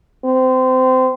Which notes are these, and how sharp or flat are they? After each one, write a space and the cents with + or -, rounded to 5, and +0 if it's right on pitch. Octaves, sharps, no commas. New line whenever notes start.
C4 -25